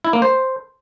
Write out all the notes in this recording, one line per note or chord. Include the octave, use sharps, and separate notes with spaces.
E4
A#3
C5